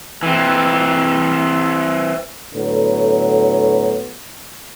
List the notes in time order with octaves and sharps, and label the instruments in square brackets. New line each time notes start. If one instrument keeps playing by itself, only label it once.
[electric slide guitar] E3 C4
[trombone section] A2 D3 F#3 B3